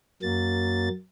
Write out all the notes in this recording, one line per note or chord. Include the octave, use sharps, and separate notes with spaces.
F#2 F#3 A#3 A6